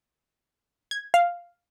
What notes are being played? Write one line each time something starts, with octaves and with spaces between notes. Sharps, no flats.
G#6
F5